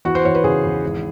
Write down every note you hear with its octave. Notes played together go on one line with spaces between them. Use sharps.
E2 F#4
C5
E2 C#5
B4
C#3 G#4
E2
G#1